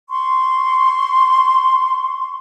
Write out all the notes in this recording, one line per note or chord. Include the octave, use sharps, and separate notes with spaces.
C6 C#6